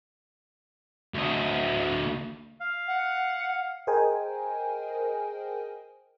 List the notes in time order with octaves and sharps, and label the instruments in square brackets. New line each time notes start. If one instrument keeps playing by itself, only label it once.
[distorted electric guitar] D2 D#5
[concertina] F5
[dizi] F#5
[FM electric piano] G#4 A#4 C5 D#5 G5 G#5